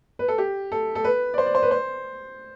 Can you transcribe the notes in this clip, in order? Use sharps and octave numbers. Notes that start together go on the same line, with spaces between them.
B4
A4
G4
A4
A4
B4
D5
C5
D5
C5
B4
C5